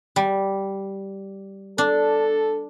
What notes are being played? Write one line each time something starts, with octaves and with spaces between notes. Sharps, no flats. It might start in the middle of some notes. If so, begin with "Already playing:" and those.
G3
D4 A4